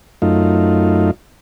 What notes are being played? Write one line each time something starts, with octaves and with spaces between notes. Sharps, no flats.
F#2 A3 D#4 F4